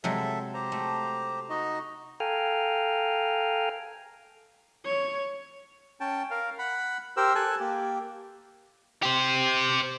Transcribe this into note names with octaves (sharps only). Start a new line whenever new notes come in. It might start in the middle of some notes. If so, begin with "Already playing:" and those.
C3 F#3 G#3 A4 E5
G4 C5 A#5
A3
D#4 F#4 D#5
A4 F5 G5 G#5 A#5 F6
C#5
C#4 G5 A5
A#4 F5
F#5 B5
G4 A#4 C5 E6
A4 G#5 A5 F#6
A#3 G4
G4 C5